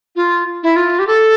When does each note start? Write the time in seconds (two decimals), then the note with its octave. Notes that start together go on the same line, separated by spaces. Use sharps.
0.16 F4
0.63 E4
0.76 F4
0.99 G4
1.07 A4